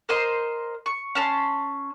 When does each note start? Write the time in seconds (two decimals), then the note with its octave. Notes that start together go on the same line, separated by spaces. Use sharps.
0.09 A#4 C5 D#5 C6
0.86 C#6
1.15 C#4 A5 A#5 C6